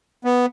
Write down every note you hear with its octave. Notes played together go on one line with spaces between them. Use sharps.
B3